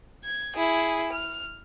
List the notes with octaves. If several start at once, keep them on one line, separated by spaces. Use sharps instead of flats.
G#6
E4 G#4
F6